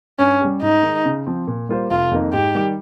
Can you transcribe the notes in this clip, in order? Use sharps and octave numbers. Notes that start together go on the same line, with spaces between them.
G2 C#4
G3 C#4 G4
G#2 D#4
D#3 G#3
C#3
F3 C4
A#2
G3 A#3 F4 C5
F1 F4
F2 D#3 A#3 D#4
G#2 G4
D#3 G3